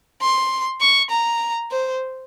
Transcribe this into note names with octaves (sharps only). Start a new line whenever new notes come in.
C6
C#6
A#5
C5